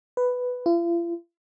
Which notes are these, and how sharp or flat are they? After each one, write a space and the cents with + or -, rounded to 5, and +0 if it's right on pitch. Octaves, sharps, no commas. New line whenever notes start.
B4 +5
F4 -45